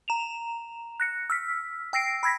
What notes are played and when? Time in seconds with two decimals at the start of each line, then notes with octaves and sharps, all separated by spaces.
0.08 A#5 E7 F7
1.00 F#6 A#6 C#7
1.30 E6 F6 B6
1.93 G5 E6 A#6 C7 D7
2.23 B5 E6 G#6 A#6 B6